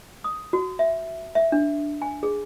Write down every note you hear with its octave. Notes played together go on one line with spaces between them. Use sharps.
D#6
F#4
E5
E5
D4
G#5
G#4